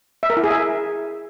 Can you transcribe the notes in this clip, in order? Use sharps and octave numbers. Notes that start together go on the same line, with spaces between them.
E5
A#4
E4
G#4
E5